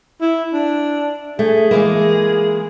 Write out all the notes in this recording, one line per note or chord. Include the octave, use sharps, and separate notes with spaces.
E4
D4
A3 G#4
E3 G#3 A#3